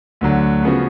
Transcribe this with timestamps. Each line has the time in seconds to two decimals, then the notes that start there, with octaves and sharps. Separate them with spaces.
0.21 D2 D3 F#3
0.63 C#3 F3 B3 F#4